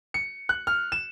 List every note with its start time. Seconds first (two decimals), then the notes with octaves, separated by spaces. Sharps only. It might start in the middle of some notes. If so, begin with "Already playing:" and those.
0.14 C#7
0.49 F#6
0.67 F6
0.92 E7